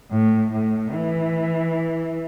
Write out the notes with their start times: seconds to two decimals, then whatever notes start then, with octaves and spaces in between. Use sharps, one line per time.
0.11 A2
0.52 A2
0.93 E3